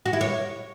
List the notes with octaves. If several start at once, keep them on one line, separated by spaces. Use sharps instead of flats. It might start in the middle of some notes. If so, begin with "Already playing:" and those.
F#4
E4
C#5